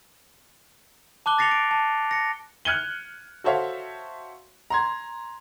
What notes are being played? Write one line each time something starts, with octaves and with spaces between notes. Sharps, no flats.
A5 D6 F#6 G7
A6 A#6 C7 C#7 F7 G7
A6 D7
A5
A#6 C#7
F6 F#6 G#6 C#7 D#7 G7
F#4 A4 C5 C#5 E5 F5
A#5 C6 G#6